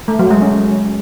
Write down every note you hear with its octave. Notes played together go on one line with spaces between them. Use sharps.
A3
F#3
G#3
C#4